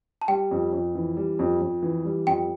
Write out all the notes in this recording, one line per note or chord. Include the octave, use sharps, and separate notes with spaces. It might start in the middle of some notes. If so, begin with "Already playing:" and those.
A5
G3 G5
F2
F2
E3
G3
F2
F2
E3
G3
F2 G5